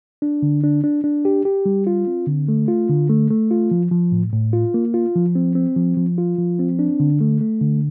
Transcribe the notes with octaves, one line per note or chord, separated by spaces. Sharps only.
D4
D3
D4
D4
D4
G4
G4
G3
F4
C4
D3
A3
F4
D3
A3
A3
F4
F3
F3
A2
A2
F4
A#3
F4
F3
C4
C4
F3
F3
F4
F3
C4
D4
D3
A3
A3
D3